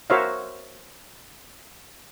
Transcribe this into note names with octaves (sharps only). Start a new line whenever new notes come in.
F#4 A#4 C5 C#5 E5 F5